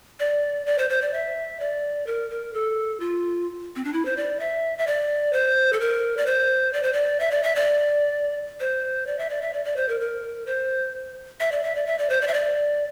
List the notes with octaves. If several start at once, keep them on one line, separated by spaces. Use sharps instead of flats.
D5
D5
C5
C5
D5
E5
D5
A#4
A#4
A4
F4
C4
D4
E4
C5
D5
E5
E5
D5
C5
A4
A#4
D5
C5
D5
C5
D5
E5
D5
E5
D5
C5
D5
E5
D5
E5
D5
D5
C5
A#4
A#4
C5
E5
D5
E5
D5
E5
D5
C5
D5
E5
D5